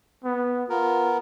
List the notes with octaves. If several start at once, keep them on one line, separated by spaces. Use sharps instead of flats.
B3
B3 F4 A#4